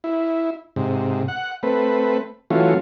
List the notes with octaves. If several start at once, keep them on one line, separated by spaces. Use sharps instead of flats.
E4
G#2 C3
F#5
A3 C4 B4
E3 F#3 A3 C#4 F4